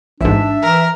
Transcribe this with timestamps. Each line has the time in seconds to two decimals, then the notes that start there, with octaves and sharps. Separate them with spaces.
0.21 A1 G#2 D4 E5
0.62 E3 A#4